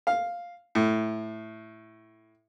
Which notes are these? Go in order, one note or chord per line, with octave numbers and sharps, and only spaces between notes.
F5
A2